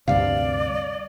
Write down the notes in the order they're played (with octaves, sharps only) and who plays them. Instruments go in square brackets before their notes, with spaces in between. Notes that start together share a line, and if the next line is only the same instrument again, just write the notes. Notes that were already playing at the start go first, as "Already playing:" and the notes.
[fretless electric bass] D2 G2 C3 [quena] D5 [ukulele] F5